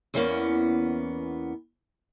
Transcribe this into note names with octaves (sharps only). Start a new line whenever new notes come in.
E2 E3 G3 A#3 B3 C#4